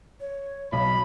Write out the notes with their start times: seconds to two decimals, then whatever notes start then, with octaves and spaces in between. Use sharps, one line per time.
0.20 C#5
0.72 B1 B5